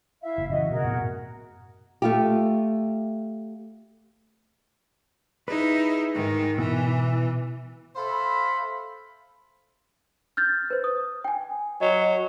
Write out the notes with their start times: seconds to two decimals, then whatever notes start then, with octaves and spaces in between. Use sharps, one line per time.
0.21 E4 E5 F5
0.38 F#1
0.50 C#3 E3 F#4 D#5
0.70 B2 F#4 G#4 A#4
0.84 F#2 A2 B3
2.02 A3 F4 G4
5.48 D#4 E4 G#4 B4
6.14 G#2 D#3
6.58 B2 E3 B3 E4
7.96 A4 C5 E5 F5 B5
10.37 F6 G6 A6
10.70 B4 C5
10.84 D#6
11.25 G5 G#5
11.81 F#3 D#5